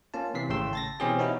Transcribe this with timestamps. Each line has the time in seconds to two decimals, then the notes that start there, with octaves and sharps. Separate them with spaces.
0.14 A#3 C#4 F4 A5
0.34 C3 E3 B6 C7
0.49 G#1 A2 C#3 G5 C6 E6
0.73 A5 A6 A#6
1.00 B2 E3 C4 C#4 G4 G#4
1.18 B3 C#4 D#4 E4 F#4